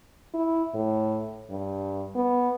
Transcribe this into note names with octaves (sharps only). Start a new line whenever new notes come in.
E4
A2
G2
B3